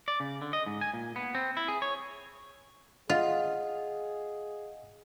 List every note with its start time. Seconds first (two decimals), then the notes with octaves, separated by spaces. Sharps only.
0.08 D5
0.20 C#3
0.42 D3
0.53 D#5
0.66 G#2
0.81 G#5
0.94 A#2
1.16 B3
1.35 C4
1.57 E4
1.68 G#4
1.82 C#5
3.10 F4 G#4 D#5 F5 F#5